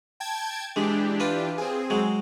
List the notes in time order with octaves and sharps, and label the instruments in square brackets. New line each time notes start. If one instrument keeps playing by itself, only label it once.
[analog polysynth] G5 A5 G#6
[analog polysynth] E3 D4 G4 [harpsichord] G#3
[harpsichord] F4 B4 D5
[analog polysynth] C4 G#4
[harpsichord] F#3 G#3